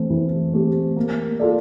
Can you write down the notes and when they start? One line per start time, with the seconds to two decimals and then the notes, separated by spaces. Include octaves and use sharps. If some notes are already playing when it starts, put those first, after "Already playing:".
Already playing: E3 A3 C4
0.10 E3
0.53 A3 C4 G4
0.97 A#3
1.40 F4 A4 D5